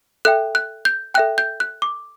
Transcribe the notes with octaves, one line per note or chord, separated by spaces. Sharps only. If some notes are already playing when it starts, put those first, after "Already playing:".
A4 E5 G5 F#6
F#6
G6
A4 E5 G5 F#6
G6
F#6
D6